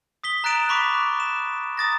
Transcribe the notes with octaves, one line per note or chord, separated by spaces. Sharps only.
D#6 B6 G7
A#5 F#6 A6 D7 E7 F7
B5 C#6 D6 B6
E7
A#5 D#6 A6 A#6